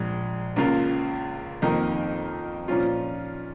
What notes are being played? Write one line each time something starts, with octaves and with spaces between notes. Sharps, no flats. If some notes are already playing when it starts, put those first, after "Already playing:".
Already playing: A#1 A#2 G#3
C#2 C#3 A#3 F4
F2 D#3 A#3 D#4
A#2 F3 C#4 F4